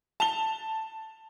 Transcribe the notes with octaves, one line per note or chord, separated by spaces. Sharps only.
A5 F7 G7